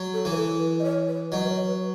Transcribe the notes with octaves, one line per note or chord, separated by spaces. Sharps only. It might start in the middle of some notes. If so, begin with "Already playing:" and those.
Already playing: F#3
A4
E3
B4
A4
B4
D#5
C#5
B4
F#3 D#5
B4
C#5
B4